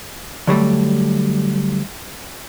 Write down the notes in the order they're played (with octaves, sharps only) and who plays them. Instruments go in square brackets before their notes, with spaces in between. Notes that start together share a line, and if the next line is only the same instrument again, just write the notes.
[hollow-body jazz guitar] D3 F#3 G3 A3